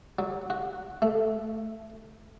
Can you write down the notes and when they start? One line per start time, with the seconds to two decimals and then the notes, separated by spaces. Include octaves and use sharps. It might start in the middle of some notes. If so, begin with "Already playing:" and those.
0.19 F#3
0.50 F#4
1.02 A3